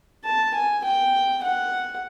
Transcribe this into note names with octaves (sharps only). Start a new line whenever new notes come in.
A5
G#5
G5
F#5